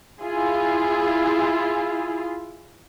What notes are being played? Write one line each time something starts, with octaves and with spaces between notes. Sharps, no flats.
E4 F4 G#4